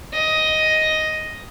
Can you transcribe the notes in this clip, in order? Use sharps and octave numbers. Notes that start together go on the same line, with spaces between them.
D#5